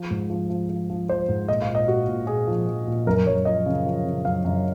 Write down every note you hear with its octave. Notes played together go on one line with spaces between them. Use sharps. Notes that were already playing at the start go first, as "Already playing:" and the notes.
Already playing: F3
G#2
F3
F3
F3
F3
F3 C5
G#2
A#2 D#5
F5
A#2
D#5
A#2 F#4
A#2
A#2 G#4
F3
F3
A#2
F#2 A#4
F#2 C#5
F3 D#5
C#3
F3
C#3
F#2 F5
F#2